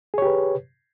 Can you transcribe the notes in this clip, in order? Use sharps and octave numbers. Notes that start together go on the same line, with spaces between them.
G4 G#4 B4 C#5